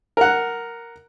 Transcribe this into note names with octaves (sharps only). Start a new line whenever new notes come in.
A#4 F#5